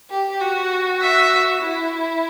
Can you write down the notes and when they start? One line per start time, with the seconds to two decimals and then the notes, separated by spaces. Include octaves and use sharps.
0.11 G4
0.41 F#4
1.02 E5
1.62 E4